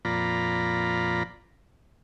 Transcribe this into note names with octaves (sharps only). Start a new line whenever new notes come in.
F2 A#2 F4 D5 A#5 B5